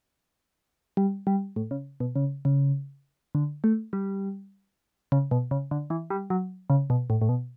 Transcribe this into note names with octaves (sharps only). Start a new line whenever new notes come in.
G3
G3
A2
C#3
B2
C#3
C#3
D3
A3
G3
C#3
B2
C#3
D3
E3
G3
F#3
C#3
B2
A2
A2
B2